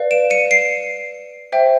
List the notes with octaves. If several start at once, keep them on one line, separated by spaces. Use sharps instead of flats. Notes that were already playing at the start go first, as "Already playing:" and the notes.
Already playing: B4 D5 F5
D7 E7
C#7 D#7
C7 D7
C5 E5 G5